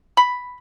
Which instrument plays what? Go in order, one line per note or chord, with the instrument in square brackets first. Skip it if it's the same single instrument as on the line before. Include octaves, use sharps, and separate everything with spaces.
[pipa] B5